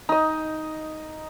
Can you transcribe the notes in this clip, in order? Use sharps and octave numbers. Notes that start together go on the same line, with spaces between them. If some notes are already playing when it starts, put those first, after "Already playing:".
D#4 D#5